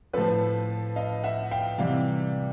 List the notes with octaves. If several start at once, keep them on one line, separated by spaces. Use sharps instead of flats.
A2 F3 A4 B4
D#5 F5
E5 F#5
F5 G5
C3 E3 G3 F5 G5